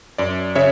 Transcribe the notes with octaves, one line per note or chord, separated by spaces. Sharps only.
F#2 D5
C#3 C#5 E5